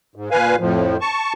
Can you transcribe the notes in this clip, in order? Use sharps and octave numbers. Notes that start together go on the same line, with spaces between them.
G#2
A#2 B4 F5 G#5
F2 A2 F3
A5 C#6